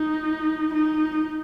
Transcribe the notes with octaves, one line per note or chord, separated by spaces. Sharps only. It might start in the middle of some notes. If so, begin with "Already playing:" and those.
Already playing: D#4
D#4